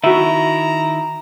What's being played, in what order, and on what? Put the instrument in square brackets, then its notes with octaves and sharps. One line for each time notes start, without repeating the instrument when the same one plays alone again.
[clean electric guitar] D#3 E4 [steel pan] F#4 E5 [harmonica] A#5